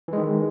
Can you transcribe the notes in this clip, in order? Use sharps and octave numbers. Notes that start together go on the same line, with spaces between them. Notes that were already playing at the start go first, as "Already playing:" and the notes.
D#3 E3 G#3